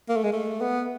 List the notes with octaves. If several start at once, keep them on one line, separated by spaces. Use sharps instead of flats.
A#3
A3
G#3
A3
B3